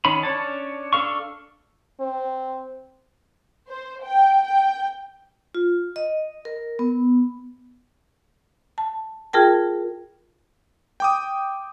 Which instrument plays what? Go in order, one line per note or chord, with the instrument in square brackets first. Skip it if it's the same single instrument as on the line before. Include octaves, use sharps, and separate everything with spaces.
[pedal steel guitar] D#3 C#4 D#4 B5
C#4 D4 C#5 A5
D4 A4 F5 C#6
[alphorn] C4
[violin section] C5
G5
G5
[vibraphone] F4
D#5
A#4
B3
[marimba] A5
F4 G#4 A#4 G5 A5
[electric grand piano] G5 D6 D#6